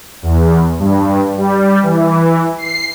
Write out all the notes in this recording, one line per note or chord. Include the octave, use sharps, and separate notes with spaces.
E2
G2
G3
E3
C7